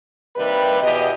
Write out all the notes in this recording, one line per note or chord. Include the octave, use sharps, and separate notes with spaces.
C3 D#3 G3 A#3 B4
E2 B2 G4 D#5